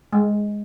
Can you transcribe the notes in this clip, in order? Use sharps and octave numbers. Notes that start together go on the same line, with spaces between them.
G#3